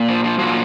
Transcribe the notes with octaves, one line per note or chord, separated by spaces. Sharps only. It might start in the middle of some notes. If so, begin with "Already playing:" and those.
Already playing: A#2
F3
F3
A#2 F3 F#3